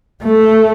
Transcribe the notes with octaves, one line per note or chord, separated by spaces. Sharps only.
A3